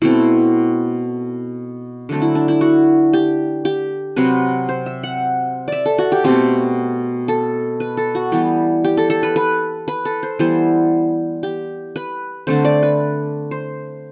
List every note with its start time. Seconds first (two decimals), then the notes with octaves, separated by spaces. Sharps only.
0.02 B2 A3 C4 E4
2.09 D3 F#3 A3 C4
2.22 E4
2.35 D4
2.48 E4
2.61 F#4
3.13 G4
3.65 G4
4.16 C3 F#3 C4 B4
4.69 C5
4.86 E5
5.03 F#5
5.68 D5 E5
5.86 A4
5.98 F#4
6.12 G4
6.24 B2 A3 C4 G4
7.28 A4
7.80 B4
7.97 A4
8.15 F#4
8.32 E3 G3 B3 G4
8.84 G4
8.97 A4
9.10 A4
9.23 B4
9.36 B4
9.88 B4
10.05 A4
10.23 C5
10.39 E3 G3 B3 C5
11.43 G4
11.96 B4
12.47 D3 A3 C4 C5
12.65 D5
12.83 B4
13.51 C5